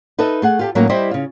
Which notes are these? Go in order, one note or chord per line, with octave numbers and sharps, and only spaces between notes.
D#4 A4 B4 D#5 E5
A3 G#4 F#5
F4 G4 A4
A2 F#3 A#3 C#4 D#4 F#4
G3 E4 G4 C5 D#5
C#3 F4